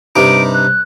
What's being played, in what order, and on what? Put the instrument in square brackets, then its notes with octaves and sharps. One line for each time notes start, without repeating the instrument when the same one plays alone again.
[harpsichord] G2 C3 D#4 [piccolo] D7
[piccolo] F#6